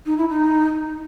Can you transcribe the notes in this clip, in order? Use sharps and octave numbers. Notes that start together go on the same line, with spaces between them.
D#4
E4
D#4